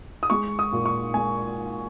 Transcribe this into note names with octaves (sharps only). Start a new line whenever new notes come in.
D#6
G#3 C#6
D#6
A#2
C#6
G#3 G#5